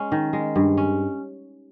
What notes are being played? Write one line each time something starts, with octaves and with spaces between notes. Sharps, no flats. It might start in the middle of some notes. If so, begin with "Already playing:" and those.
Already playing: G#3 C#4
D#3
G#3
G2
C#4